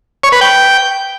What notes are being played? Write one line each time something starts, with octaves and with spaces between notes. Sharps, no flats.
C#5
B4
G5